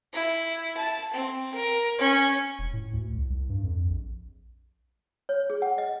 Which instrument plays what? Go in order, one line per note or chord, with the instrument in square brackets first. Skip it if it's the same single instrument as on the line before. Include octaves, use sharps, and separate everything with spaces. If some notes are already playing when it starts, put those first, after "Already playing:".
[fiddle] E4
A5
C4
A#4
C#4
[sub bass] E1
A2
D2
C2
C2
G2
F2
A#1
[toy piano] C#5
G#4
F#5
D#5